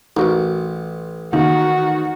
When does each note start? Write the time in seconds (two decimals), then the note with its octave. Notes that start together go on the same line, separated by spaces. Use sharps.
0.17 A1 D#4 F#4 A#4
1.33 D#3 A#3 F#4